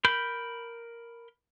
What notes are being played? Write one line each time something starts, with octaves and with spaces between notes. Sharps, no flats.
A#4 B5 G6